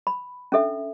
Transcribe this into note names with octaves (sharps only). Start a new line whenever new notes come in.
B5
C#4 D4 A4 E5